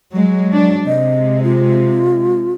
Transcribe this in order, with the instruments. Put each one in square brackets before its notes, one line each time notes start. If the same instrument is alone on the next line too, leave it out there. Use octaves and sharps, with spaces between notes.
[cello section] F#3 G#3
F#3 D4
[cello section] C3 G#3 [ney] D#5
[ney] F4